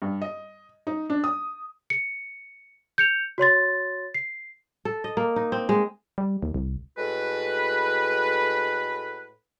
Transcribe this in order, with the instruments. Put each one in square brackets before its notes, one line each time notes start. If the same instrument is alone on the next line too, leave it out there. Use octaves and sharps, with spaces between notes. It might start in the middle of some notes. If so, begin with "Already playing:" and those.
[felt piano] G2
D#5
D#4
D4
D#6
[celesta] C#7
G6 C#7 F7
F#4 C#5 C6 A6
C7
[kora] A4
D#5
A#3
D#4
C4
G#3
[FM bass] G3
D#2
C2
[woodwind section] A2 G#3 F#4 A4 B4